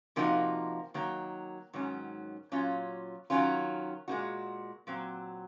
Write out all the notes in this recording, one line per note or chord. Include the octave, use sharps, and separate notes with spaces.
C3 F3 A#3 D#4 F#4
D#3 F#3 A#3
G#2 D#3 F#3 C#4
A#2 F#3 C#4 F4
D#3 F#3 C#4 F4
A#2 G#3 D#4 F#4
A#2 F#3 C4